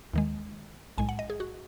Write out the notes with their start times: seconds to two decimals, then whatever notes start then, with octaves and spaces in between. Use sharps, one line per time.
0.14 D#2 D#3 G#3
0.98 B1 A2 G#3 G#5
1.09 F#5
1.19 D#5
1.30 G#4
1.40 F#4